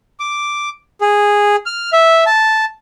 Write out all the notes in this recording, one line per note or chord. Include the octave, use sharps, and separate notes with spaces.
D6
G#4
F6
E5
A5